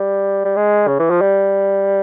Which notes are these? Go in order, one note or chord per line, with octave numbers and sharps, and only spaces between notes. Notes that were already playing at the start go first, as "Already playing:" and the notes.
Already playing: G3
G3
G#3
C#3
E3
F3
G3